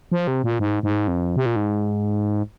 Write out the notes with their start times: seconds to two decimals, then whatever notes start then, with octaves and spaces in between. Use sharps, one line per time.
0.12 F3
0.27 C3
0.44 A#2
0.59 G#2
0.83 G#2
1.08 F2
1.36 C3
1.46 A#2
1.56 G#2